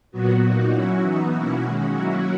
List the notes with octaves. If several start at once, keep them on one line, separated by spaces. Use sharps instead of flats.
A#2 F#3 B3 F#4
A#2 A#3 D#4
F#3 C#4 E4
E3 B3 D#4
B2 A#3 C#4 E4 F#4
D#3 G#3 C#4
F#3 A#3 C#4 E4